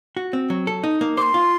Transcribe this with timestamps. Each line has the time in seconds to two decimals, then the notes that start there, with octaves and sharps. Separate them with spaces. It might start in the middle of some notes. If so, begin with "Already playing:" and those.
0.17 F#4
0.33 C4
0.50 F#3
0.67 A4
0.83 D#4
1.01 A#3
1.17 C5 C6 D6
1.34 F4